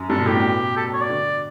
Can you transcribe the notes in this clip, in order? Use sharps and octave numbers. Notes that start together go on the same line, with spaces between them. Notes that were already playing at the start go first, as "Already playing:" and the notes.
Already playing: F#2
G2 A4
B2
A2 G4
B2
A4
C#5
D5
D3